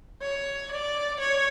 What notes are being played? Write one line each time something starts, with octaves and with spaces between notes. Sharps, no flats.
C#5
D5
C#5